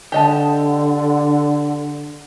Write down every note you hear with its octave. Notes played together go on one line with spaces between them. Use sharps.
D3 G4 D#5 A5